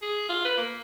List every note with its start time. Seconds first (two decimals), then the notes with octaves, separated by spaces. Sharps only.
0.02 G#4
0.29 F4
0.45 B4
0.58 A#3